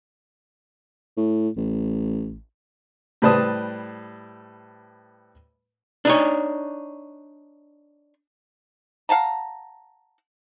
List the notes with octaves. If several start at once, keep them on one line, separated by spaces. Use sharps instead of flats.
A2
A1
A2 G3 B4 C5 A5 D#6
D4 D#4 C#5
F5 F#5 A5 A#5